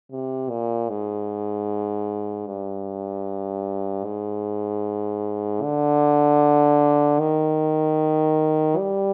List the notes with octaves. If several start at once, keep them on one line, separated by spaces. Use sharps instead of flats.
C3
A#2
G#2
G2
G#2
D3
D#3
G3